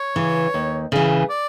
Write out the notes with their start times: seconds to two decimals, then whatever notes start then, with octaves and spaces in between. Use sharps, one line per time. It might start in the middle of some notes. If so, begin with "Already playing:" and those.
Already playing: C#5
0.16 C#3 E3
0.54 D#2
0.92 C#3 E3
1.30 D5